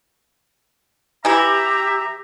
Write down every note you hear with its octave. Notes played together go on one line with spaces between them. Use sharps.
E3 E4 G4 E5 A#5